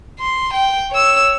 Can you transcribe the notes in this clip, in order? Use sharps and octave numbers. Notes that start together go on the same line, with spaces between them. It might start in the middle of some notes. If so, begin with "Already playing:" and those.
C6
G5
C#5 E6